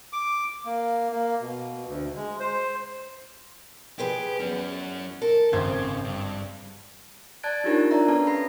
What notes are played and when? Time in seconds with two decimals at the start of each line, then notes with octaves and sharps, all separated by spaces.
0.13 D6
0.65 A#3
1.12 A#3
1.41 B2
1.87 D2
2.16 G#3
2.40 C5
3.99 F3 G4 G#4 B4
4.40 E2 F#3 C#4
5.22 A4 A#4
5.53 G#1 F2 C#3 C5 G#6
6.05 G2
7.43 D5 A5 F#6 G#6 A6 D7
7.64 D4 D#4 F4 G4 A#4 C#5
7.91 D4 D5 E5 A#5
8.08 B3 C#4 A4 B4 C#5 A5
8.27 B5 A#6 C7